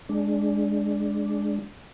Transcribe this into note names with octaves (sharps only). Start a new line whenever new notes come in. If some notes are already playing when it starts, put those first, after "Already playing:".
G#3 D4